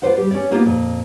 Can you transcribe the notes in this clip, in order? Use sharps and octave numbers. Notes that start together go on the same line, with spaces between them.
F4 G4 B4 C5 D5 F#5
G3 G4
C#4 G4 C#5 D5
A#3 B3 D#4 F4 G4 A#4
F2 A#2